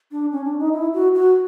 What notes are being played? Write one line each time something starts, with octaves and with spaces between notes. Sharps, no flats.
D4
C#4
D4
D#4
E4
F#4
F#4